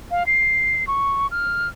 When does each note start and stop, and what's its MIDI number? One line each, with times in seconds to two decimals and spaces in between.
0.11 0.26 77
0.26 0.86 96
0.87 1.27 85
1.31 1.68 89